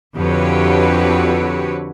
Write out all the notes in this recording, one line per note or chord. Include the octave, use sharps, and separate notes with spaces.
F2 D3 F#4 G4 B4 C#5